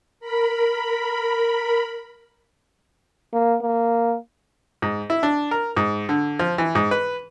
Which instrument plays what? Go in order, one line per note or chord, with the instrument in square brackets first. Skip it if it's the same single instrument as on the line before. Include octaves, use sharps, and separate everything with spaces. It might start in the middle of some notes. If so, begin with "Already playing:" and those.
[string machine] A#4 B5
[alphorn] A#3
A#3
[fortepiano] G#2
E4
D4
A#4
G#2
D3
F3
E3
G#2
B4